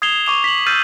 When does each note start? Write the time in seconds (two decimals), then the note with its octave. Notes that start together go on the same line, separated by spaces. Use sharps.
0.02 D#6 G#6 C7 E7 F7 G7
0.26 C#6 D6 F7
0.44 B6 F#7
0.66 E6 F6 G6 A6 C7 D#7